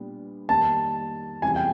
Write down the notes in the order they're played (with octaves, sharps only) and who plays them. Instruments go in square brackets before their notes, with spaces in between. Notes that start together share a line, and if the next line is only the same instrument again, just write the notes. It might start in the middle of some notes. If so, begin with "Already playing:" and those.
Already playing: [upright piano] A#2 G3 B3 D4
[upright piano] D#3 G3 A#3 D#4 [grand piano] A5
[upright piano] C#2 C3 E3 G3 [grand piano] G#5
[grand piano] G5